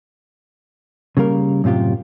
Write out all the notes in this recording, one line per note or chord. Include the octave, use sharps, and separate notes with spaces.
C#3 G3 A#3 A#4
F#2 A2 C3 F4 G4